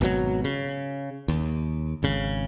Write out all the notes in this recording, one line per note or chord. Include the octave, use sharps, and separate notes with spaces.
G#1 B2 D3 F#3
C#3
D#2
G#1 C#3